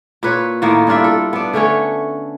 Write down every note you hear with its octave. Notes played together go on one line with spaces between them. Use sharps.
A#2 B4 C#5
A2 D#3 A#3 B3
G2 D4 F4 E5
A4
B3 D4
D3 A3 C#4 C#5